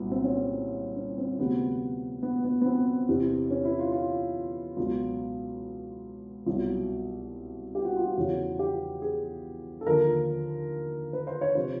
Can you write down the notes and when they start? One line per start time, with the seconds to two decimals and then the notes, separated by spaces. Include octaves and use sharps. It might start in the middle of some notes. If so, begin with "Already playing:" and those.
Already playing: C2 A#2 F#3 B3
0.12 C4
0.24 C#4
0.36 C4
0.96 C#4
1.18 C4
1.39 D2 C3 F3 B3
2.23 B3
2.44 B3
2.61 B3
2.66 C4
3.09 E2 C3 E3
3.50 C#4
3.65 E4
3.79 F4
3.92 F4
4.77 C#2 B2 F#3
6.46 C2 B2 F#3 F4
7.75 G4
7.85 F#4
7.96 F4
8.07 F#4
8.17 E2 C#3 F3
8.59 G4
9.02 G#4
9.81 A4
9.86 D#2 D3 F3 A#4
11.13 B4
11.27 C5
11.41 C#5
11.55 C3 F3 C5